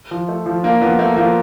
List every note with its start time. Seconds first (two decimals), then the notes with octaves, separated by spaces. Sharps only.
0.11 F3
0.28 A3
0.46 F3
0.63 A#3 D4
0.81 F3 B3
0.99 A3 A#3
1.16 F3 A#3